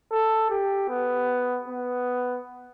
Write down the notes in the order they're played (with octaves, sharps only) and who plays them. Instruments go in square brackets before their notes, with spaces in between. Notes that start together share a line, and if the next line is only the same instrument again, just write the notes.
[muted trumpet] A4
G4
B3
B3